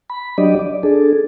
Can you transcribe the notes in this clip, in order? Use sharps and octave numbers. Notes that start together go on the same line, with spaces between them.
B5
F#3 D4 G4 D5 D#5
D5
D4 G#4 A4